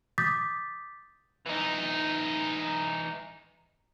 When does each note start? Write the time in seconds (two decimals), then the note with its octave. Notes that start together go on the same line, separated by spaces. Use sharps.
0.18 D6 D#6 G6 A6 B6
1.46 E3 D#4